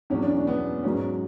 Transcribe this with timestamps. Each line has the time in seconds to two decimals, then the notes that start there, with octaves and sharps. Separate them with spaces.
0.10 E2 B2 F#3 C#4
0.22 D4
0.35 D4
0.47 B3
0.83 G#2 F#3 C#4